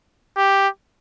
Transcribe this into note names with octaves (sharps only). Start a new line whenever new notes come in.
G4